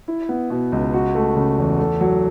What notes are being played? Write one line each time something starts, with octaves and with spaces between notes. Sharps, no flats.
E4
B3
B2
C#2
F#4
A3
C#3
E2
A3
F#3